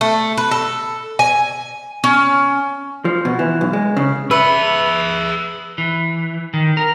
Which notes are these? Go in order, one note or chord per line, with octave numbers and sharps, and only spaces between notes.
A3
B4
A4
G#5
C#4
F3
B2
E3
B1
G#3
C#3
G#4 B4 E5 E6
E3
D#3
A#4